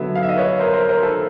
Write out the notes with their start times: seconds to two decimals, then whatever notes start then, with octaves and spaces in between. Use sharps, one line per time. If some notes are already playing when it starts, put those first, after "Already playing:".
Already playing: D3 F#3 B3 E5
0.15 F5
0.23 E5
0.29 D#5 F5
0.36 B4 C#5
0.59 A#4 C5
0.73 A#4 C5
0.89 A#4 C5
1.03 A4 B4